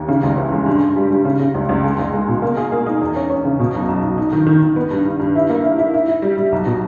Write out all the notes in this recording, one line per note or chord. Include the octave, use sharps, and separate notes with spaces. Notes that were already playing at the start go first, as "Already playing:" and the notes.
Already playing: D#2
C#3
C#2
E3
G#3
G2
G2
G3
G3
C#3
C#3
C#2
C#2
G#3
C#2
G#3
B2
A#3
G#4
A#3
D#4
E2
C#4
C#4
C#3
B2
B1
B1
B1
D#4
D#3
D#3
D#3
B3
G2
G2
G2
E4
A#3
E4
E4
E4
E4
G3
G3
B1
B2